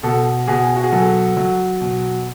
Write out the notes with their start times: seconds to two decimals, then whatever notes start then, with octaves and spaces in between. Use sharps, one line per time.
0.03 B2 A4
0.48 B2 G#4
0.76 F#4
0.84 G#4
0.92 F#3 A4
1.37 F#3
1.81 B2